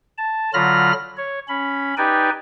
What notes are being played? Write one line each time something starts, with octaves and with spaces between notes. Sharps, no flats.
A5
D3 F#3 F4 B5 F6 A#6
C#5
C#4 B5
D#4 G4 B4 D5 G5 G#5